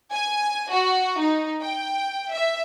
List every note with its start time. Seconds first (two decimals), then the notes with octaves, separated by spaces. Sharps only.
0.12 G#5
0.71 F#4
1.20 D#4
1.61 G5
2.33 E5